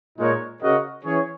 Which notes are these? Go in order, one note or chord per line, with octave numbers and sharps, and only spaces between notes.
A#2 G#3 D#4 A#4 C#5
C#3 F#4 A#4 D#5 F#5
E3 C#4 G#4 C#5